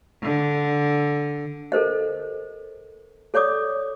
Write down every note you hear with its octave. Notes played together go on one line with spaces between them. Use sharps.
D3
A4 A#4 C5 D#5
A4 C#5 D5 D6 D#6